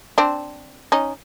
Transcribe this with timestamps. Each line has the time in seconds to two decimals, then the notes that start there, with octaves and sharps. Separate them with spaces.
0.18 C4 D4
0.92 C#4 D#4